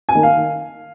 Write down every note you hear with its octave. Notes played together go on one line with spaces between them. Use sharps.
G#5
D#3 A#3 D#4
F5
D#3